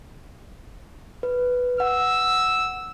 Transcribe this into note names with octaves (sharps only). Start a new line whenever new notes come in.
B4
F#5 E6